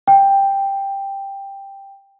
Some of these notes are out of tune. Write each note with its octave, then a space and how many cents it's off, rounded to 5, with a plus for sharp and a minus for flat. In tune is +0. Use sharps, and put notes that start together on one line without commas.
G5 +5